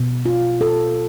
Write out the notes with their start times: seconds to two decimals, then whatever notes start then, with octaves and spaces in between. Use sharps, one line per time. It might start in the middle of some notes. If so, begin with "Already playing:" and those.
Already playing: B2
0.26 F4
0.61 A4